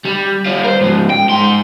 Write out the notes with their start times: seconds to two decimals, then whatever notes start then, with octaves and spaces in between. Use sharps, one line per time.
0.05 G3
0.45 G3 F4
0.64 A#4 C5
0.81 G#2 F3
1.10 G5
1.30 G#2 C6